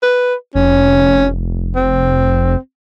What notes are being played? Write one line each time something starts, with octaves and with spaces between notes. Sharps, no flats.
B4
F1 C#4
C4